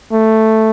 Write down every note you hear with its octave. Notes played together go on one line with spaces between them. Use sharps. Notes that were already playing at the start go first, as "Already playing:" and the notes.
A3